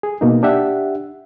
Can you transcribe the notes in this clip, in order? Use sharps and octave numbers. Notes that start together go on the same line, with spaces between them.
G#4
B2 A#3 D#4
D4 G4 E5 F#5